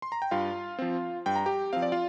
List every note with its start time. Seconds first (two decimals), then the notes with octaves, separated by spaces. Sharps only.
0.02 C6
0.12 A#5
0.22 G5
0.31 G2 F4 F5
0.79 F3 C4
1.26 G2 G5
1.36 A#5
1.46 G4 G5
1.73 F3 C4 F5
1.82 D5
1.92 F4 F5